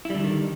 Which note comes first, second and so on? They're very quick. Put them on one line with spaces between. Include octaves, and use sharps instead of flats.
E4 G3 D3 F#3 D#3